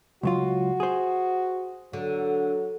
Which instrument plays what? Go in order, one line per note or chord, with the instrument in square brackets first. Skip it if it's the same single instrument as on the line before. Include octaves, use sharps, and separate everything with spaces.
[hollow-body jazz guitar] C#2 F#3 F4 [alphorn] F#4
[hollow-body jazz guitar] G#4 C5
[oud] D3 [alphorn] F#3